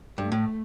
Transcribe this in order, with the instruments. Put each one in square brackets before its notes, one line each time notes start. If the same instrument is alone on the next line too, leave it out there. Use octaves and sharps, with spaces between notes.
[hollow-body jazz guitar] G2 [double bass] A3
[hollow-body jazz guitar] A2